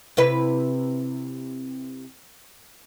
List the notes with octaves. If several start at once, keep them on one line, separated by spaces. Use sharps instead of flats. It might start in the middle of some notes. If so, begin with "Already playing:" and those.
C3 E4 B4